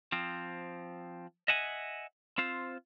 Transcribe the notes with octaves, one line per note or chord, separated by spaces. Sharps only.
F3 C4
D#5 E5 F#5 G#5
C4 F4 C5